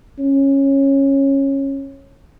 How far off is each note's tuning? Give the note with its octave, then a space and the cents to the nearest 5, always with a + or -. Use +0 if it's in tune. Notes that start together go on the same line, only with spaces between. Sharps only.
C#4 -15